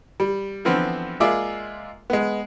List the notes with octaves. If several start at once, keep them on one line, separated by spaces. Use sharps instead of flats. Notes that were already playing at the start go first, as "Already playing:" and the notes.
G3
D3 E3 F3 B3 C4
G#3 A#3 F4 G#4 D5 E5
G#3 B3